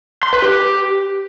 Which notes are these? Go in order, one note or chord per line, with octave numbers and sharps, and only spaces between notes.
C6
B4
G4